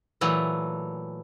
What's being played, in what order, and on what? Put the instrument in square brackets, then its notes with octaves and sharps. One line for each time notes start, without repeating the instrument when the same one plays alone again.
[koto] A#2 E3 F#3 A3